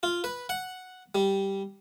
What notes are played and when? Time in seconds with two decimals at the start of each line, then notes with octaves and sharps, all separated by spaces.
0.03 F4
0.24 B4
0.49 F#5
1.15 G3